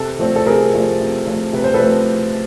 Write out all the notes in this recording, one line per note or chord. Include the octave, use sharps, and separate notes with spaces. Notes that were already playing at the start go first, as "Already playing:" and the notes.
Already playing: C3 A4
F3 A3 C4
A4
C3 G#4 A#4
F3 A3 C4
C3
F3 A3 C4
C3 B4
C5
A4 B4
F3 A3 C4